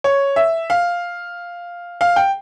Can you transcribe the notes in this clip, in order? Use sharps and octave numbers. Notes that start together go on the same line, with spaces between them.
C#5
E5
F5
F5
G5